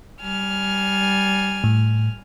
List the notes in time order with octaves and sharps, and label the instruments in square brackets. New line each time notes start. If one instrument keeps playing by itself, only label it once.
[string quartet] G3 G#5 F6
[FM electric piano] A2